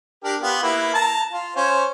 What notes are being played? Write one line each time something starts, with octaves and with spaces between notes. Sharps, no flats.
D4 G4 A#4
B3 F4 G4
A#3 E4 B4
A5 A#5
F4
C#4 C5